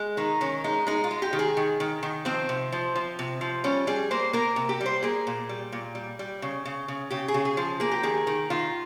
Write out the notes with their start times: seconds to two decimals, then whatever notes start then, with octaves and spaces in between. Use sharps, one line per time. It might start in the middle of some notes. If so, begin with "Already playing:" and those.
Already playing: G#3
0.17 D#3 D#4
0.41 D#3 C#4
0.64 G#3 D#4
0.87 G#3 D#4
1.04 F4
1.11 G#3
1.22 G4
1.33 D#3
1.39 G#4
1.57 D#3
1.80 D#3
2.03 D#3
2.25 F3 C4
2.49 C3
2.72 F3
2.95 F3
3.19 C3
3.41 F3
3.64 G3 C#4
3.87 G3 G#4
4.11 A#3 C5
4.33 A#3 A#4
4.56 C3
4.69 G4
4.81 G3
4.86 C5
5.03 A#3 G#4
5.27 A#2
5.49 G3
5.72 A#2
5.95 G3
6.19 G3
6.42 C#3
6.65 C#3
6.88 C#3
7.10 C#3 G4
7.28 G#4
7.34 C#3
7.45 G#4
7.57 F3
7.80 A#3 G#4
7.91 G4
8.03 D#3 G#4
8.27 D#3
8.50 D#3 F4